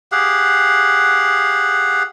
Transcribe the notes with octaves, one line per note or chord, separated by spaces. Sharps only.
G4 G#4 F5 F#5